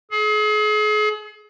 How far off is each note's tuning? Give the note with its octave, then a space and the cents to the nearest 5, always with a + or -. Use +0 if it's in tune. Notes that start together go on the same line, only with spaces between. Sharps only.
G#4 +40